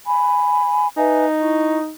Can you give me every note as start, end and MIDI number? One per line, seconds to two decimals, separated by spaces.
0.06 0.88 80
0.06 0.88 83
0.97 1.93 63
0.97 1.25 71
0.97 1.25 76
0.97 1.25 80
1.39 1.79 64
1.39 1.79 85